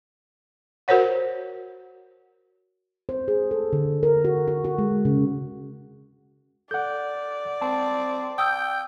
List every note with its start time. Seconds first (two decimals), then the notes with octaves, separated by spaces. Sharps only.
0.88 F#4 A#4 C5 C#5 F#5
3.09 C5
3.28 G#4
3.51 A4
3.73 D3
4.03 A#4
4.25 F#4
4.48 F#4
4.65 F#4
4.78 G#3
5.05 C#3
6.71 A4 D5 F#5 G6
7.61 C4 A5
8.38 G5 D#6 E6 G6